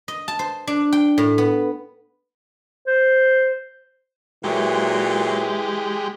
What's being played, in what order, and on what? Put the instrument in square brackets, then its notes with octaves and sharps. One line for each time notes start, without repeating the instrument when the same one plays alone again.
[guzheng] D#5
A5
C5
D4
G5
A2
B3
[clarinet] C5
[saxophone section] A#2 F#3 [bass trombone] E3 [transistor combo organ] G#3 G4